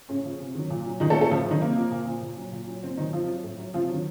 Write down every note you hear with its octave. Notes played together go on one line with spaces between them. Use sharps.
A2 C#3 C#4
F3
C3
D#3 F#3
A#2
F#3
A#2 D#3 D#4
A3 A4
F3
A3 A4
A2 F3 F4
D#3 F#3 D#4
C3 A#3
F3
A#2
F3
A#2
F#3
A#2
F#3
A#2 C4
D#3 F#3 D#4
C3 F3 F4
F#3
A2
F#3
C3 F3 F4
D#3 F#3